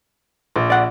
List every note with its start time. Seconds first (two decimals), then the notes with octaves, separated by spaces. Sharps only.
0.56 A#1
0.70 D5 F#5